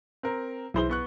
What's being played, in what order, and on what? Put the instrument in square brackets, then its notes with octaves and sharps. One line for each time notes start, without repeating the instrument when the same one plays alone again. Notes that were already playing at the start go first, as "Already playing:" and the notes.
[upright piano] C4 A#4
[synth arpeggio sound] B1 E4 G#4 [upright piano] E3 C5 G7
[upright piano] B3 C#6 F#6